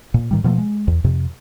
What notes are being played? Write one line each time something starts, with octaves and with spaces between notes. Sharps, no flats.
A#2
A2 D#3 G3
B2 F3 G3 A3
G#3
E2
F2 C3